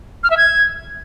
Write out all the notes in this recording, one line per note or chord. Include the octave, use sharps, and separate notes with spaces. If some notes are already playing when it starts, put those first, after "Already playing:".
F6
E5
G#6